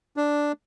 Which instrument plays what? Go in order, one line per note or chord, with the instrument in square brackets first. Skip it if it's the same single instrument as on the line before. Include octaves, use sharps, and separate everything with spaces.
[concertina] D4